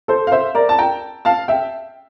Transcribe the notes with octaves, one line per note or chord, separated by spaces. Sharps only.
A4 C5
F5
C5 E5
A#4 D5
A5
G5 A#5
F5 A5
E5 G5